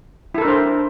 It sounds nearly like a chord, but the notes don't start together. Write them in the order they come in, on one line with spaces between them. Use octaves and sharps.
E4 A4 A#4 D4 C5